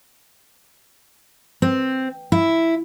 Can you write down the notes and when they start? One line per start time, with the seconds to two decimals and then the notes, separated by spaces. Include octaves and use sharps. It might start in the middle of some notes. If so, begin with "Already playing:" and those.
1.62 C4
2.32 E4